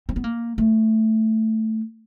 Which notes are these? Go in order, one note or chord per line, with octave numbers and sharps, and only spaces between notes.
C4
B3
A#3
A3